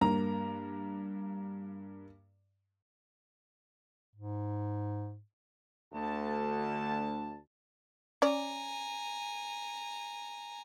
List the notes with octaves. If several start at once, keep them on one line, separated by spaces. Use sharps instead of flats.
G2 A#3 A#5
G#2
D2 A5
C#4 D5 G#5 A#5